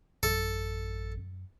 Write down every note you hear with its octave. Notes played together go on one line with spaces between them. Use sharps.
A1 F#2 A4